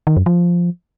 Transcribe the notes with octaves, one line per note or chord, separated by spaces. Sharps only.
D#3
F#2
F3